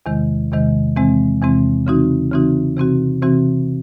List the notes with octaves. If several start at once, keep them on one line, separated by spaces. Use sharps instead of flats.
E2 C3 D#3 G#3
E2 C3 D#3 G#3
E2 C3 E3 G#3 C4
E2 C3 E3 G#3 C4
C#3 E3 C4 D#4 F#4
C#3 E3 C4 D#4 F#4
C3 E3 C4 F#4
C3 E3 C4 F#4